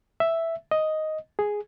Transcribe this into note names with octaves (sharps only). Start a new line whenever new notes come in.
E5
D#5
G#4